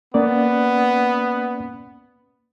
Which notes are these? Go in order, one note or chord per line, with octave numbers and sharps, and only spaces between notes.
A#3 B3 C#4 D5